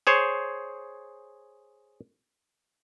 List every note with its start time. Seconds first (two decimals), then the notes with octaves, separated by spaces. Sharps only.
0.07 G#4 C5 C#5